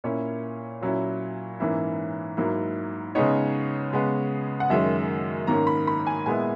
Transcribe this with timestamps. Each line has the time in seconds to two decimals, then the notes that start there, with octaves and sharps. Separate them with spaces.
0.04 A#2 A#3 C#4 E4 C#5
0.81 A#2 F#3 C#4 E4
1.60 G#2 E3 A#3 C#4 E4
2.37 G#2 F#3 A#3 E4
3.15 C#3 G#3 B3 D#4 C#5
3.93 C#3 G#3 B3
4.60 F#5
4.70 F#2 D#3 G#3 C#4 E5
5.47 G#2 D#3 A#3 C#4 A#5
5.67 B5
5.87 B5
6.07 G#5
6.26 A#2 G#3 B3 E4 G#5